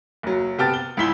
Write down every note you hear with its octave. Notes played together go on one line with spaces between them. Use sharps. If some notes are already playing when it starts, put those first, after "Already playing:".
F#1 F#3
C3 B3 G5 A5 F6 A6
G7
C#2 G#2 E4 B6 G7